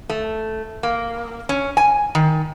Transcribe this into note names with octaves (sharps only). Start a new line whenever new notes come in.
A3
A#3
C#4
G#5
D#3